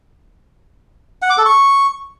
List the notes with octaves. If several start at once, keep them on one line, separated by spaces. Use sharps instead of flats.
F#5
D6
A4
C#6